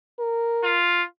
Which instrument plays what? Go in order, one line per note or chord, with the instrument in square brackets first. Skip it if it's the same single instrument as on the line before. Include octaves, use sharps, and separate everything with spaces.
[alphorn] A#4
[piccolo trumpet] F4